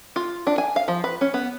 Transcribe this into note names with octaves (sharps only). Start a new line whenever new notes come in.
F4
D4
G#5
F5
F3
B4
C#4
B3